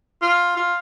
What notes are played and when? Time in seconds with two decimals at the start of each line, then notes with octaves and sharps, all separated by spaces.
0.22 F4
0.56 F4